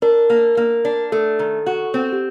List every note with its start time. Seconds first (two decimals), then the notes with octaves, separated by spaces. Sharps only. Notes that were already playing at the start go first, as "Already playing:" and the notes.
0.02 D4 A#4
0.30 A#3
0.57 A#3
0.85 D4
1.12 A3 A4
1.39 D#3
1.66 F#4
1.94 C4
2.13 G4